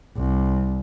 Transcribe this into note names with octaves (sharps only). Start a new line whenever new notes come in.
C2